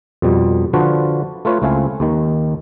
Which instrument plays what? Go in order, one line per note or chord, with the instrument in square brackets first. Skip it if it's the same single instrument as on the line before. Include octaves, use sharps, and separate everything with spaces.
[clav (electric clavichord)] F2 B2 G3
D3 F3 D4 F4 F#4 B4
A3 F4 B4 C#5
C#2 A3 C4 E4 F5 G#5
D#2 D#3